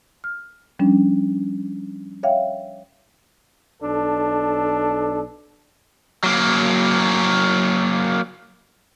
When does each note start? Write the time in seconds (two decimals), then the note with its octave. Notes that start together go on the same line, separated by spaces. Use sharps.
0.24 F6
0.79 F3 G3 C#4 D4
2.23 C#5 E5 F5 G5
3.81 B1 D4 A4
6.24 F#3 A#3